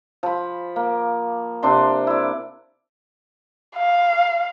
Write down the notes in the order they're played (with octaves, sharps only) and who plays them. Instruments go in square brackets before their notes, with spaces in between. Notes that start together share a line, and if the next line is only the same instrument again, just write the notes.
[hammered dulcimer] F3 B5
A#3
C3 D4 C6
E4 D5
[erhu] F5